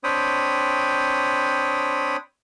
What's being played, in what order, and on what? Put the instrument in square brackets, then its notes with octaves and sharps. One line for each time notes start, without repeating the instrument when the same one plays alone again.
[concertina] C4 D4 C#5 G5 B5 D#6